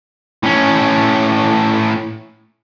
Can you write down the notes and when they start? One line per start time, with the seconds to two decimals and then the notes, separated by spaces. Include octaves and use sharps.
0.43 A2 C#4